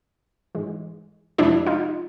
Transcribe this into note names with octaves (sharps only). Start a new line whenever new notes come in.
G#2 E3 G#3
F2 C3 F3 G#3 D4 E4
D#4 F4